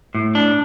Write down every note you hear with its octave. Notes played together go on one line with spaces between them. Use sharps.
A2
D4